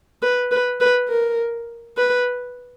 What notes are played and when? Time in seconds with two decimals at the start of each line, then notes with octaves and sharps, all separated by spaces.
0.22 B4
0.51 B4
0.81 B4
1.09 A#4
1.97 B4